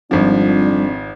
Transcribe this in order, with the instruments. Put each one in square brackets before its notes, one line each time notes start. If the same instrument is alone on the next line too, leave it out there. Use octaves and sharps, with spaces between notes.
[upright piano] G#1 F3 [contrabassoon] F2 [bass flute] G3 [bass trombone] D4